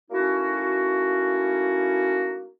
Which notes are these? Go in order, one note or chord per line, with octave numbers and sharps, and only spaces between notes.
A3 A#3 C#4 D#4 E4 F#4